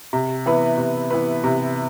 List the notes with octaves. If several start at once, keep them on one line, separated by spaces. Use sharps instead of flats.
C3
E3 B3 E4 B4
C3
E3 B3 E4 B4
C3